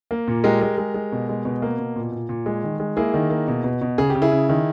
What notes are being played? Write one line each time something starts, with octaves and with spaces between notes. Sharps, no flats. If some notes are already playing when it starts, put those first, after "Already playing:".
A#3
A#2
G#3 G4 A#4
G#3
G#3
G#3
B2
G#3
B2
A#3
B2
A#2
A#2
A#2
G#3
D#3
G#3
A#3 E4 G#4
D#3
A#3
B2
B2
B2
C#3 G#4
C#3 G4
E4 G#4
C#3
D#3